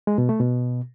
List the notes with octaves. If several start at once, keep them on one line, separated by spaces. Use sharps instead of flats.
G#3
B2
A3
B2